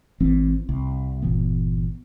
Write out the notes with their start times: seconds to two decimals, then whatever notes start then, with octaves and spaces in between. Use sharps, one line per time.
0.20 G#1 E3 C4
0.69 C2
1.22 G1 A#2 E3 B3